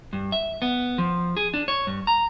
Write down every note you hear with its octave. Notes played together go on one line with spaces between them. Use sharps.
G2
E5
B3
F3
G#4
D4
C#5
G2
A#5